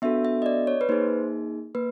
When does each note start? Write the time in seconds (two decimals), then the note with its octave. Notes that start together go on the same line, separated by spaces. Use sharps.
0.02 B3 D4 F#4 A4 E5
0.25 E5
0.42 D#5
0.46 D5
0.67 C#5
0.81 B4
0.89 A#3 D#4 G#4 C5
1.75 A#3 B4